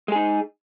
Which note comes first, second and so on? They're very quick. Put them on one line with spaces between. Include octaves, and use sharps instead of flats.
G#3 G#4 D#4